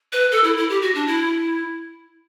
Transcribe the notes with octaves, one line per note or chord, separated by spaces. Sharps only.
B4
A4
E4
E4
G4
F#4
D4
E4